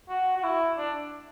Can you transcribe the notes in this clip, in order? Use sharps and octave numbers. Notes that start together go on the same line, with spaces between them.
F#4
F#4
E4
D4